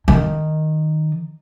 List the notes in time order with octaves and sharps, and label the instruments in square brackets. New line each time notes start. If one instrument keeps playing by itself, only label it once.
[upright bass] D#3